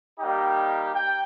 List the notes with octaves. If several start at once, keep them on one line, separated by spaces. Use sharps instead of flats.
G3 A#3 D#4 G4
G5